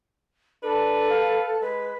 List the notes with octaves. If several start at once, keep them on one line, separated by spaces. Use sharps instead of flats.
D4 A4 B4
F5
G#3 B4